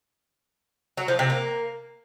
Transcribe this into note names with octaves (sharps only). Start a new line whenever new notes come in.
F#3
F3
C3
A#3